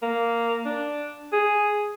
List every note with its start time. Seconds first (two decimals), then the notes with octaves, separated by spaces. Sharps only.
0.02 A#3
0.65 D4
1.32 G#4